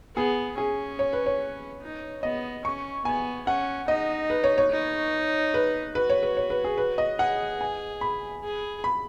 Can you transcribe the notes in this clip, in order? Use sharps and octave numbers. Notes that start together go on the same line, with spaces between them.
B3 G#4
C#4 G#4
C#5
B4
C#5
D#4
B3 D#5
C#4 C#6
B3 G#5
C#4 F#5
D#4 D#5
B4
C#5
C#5
D#4
B4
F#4 B4
C#5
B4
C#5
B4
G#4
B4
D#5
G#4 F#5
G#5
B5
G#4
B5